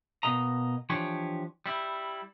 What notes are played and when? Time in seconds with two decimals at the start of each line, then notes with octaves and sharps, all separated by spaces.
0.23 B2 A#3 D#5 A#5
0.90 E3 F3 D4 G4 C#5
1.66 G3 E4